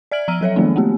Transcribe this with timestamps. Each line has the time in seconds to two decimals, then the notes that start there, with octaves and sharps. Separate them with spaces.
0.12 D5 E5 F6 G#6 D7 F#7
0.28 F3 A#5 E6 F6 D#7
0.41 F#3 A4 C#5 E5
0.56 D#3 F3 G#3 A#3 B3 D4
0.76 A3 B3 C4 G4